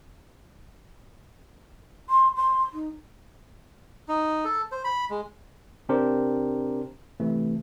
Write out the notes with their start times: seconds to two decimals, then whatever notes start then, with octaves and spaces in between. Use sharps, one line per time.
2.09 C6
2.36 C6
2.73 D#4
4.08 D#4
4.45 A4
4.72 C5
4.84 B5
5.10 G#3
5.89 C3 C4 D4 G4 A#4 C5
7.20 C3 E3 A3